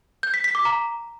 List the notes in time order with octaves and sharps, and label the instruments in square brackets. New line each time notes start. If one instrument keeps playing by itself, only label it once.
[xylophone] G6
B6
B6
D6
A#5